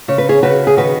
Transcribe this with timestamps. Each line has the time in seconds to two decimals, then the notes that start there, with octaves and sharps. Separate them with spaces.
0.08 C#3 C#5
0.18 B4
0.29 G#4 C#5
0.43 C#3 F#4 B4
0.67 G#4
0.77 D#3 F#4 B4